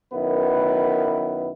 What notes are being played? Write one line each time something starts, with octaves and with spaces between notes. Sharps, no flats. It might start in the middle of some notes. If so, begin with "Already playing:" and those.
F#2 D#3 B3 E4 B4